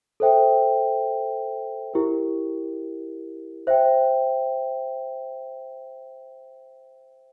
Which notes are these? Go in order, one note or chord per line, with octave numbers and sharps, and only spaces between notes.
A4 C5 E5 G5
E4 G4 A#4
C5 E5 G5